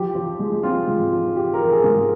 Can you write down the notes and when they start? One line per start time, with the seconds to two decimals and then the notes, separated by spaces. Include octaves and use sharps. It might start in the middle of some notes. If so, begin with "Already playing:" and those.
Already playing: F3 G4
0.15 F3
0.39 G#3
0.63 C4 F4
0.87 G#2
1.12 F3
1.36 F3 G4
1.54 A#4
1.60 F3
1.72 G#4
1.84 G#2
1.90 G#4